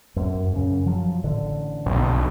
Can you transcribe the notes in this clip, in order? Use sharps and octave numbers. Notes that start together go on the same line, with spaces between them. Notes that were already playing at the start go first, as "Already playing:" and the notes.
F#2
F#2 C#3
F3 F#3
A1 D3
B1